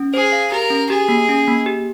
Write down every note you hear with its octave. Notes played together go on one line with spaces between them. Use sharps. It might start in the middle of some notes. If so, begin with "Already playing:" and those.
Already playing: C#4
G#4 C5
F5
G4 A#4
C#4
G4 G#4
A#3
C#4
A#3
G4